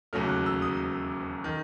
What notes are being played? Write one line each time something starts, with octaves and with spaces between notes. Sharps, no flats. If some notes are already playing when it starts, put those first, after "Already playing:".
E1 D#2 C#3 F#3 A3 F6
F#6
E6
D#6
D#3